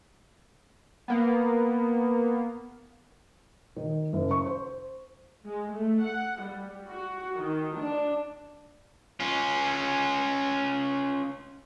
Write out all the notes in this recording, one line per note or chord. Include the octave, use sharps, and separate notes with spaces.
A#3 B3
D#3
F#1
C#6
C5
G#3
A3
F#5
G3
F#4
D#3
D4
C#4 F4